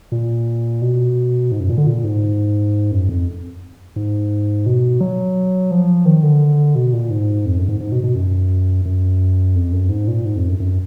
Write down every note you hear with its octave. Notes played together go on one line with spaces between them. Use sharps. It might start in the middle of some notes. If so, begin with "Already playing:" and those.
A#2
B2
G#2
F#2
A#2
D3
A#2
G#2
F#2
F2
G#2
B2
F#3
F3
D#3
D3
B2
A#2
G#2
F2
F#2
G#2
G#2
B2
B2
F#2
F#2
F2
F#2
G#2
A#2
G#2
F2
F#2
F#2